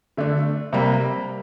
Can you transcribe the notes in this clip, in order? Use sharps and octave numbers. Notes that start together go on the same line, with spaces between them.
D3 A3 D4
C3 G3 A#3